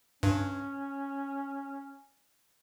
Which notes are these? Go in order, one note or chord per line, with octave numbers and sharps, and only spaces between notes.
G2 C#4